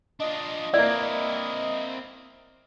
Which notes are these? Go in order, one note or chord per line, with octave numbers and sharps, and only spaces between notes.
D4 F4 D#5
A#3 C4 E4 B4 D5